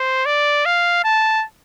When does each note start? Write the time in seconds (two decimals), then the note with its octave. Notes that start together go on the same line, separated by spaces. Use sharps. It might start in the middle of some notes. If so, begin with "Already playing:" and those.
Already playing: C5
0.26 D5
0.65 F5
1.04 A5